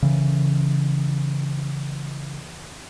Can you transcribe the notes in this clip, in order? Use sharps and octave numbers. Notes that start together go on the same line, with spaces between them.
C#3 E3